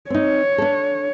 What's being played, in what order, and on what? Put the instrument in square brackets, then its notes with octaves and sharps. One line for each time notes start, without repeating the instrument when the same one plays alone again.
[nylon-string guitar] C4 D#4 [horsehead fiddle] C#5
[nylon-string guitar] D4 A4